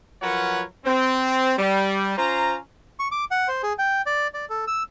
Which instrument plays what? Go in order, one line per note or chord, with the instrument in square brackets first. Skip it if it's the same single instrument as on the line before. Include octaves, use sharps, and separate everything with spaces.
[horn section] F3 F#3 A#4 B4 C#5 F#5
C4
G3
C#4 F4 C5 A#5
[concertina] C#6
D6
F#5
C5
G#4
G5
D5
D5
A4
E6